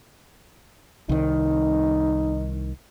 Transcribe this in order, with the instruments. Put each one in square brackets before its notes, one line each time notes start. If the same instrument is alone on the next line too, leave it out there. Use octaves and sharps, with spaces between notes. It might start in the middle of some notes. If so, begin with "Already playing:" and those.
[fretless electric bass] C2 D#3 [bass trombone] D#4